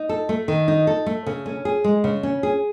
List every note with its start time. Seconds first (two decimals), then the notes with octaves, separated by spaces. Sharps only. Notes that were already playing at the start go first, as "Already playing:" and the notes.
Already playing: D#4
0.09 A4
0.29 A3
0.48 D#3
0.68 D#4
0.87 A4
1.06 A3
1.27 C#3
1.46 C#4
1.65 G#4
1.84 G#3
2.04 C#3
2.23 C#4
2.43 G#4